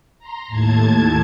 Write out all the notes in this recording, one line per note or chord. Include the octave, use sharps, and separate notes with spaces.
A#5 C6
D#2 A2 A5 G#6